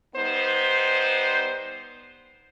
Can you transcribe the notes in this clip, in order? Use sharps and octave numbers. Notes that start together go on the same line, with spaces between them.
G3 B3 D#4 C5